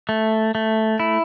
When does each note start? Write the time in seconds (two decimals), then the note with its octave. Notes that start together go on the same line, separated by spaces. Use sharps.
0.09 A3
0.55 A3
1.00 E4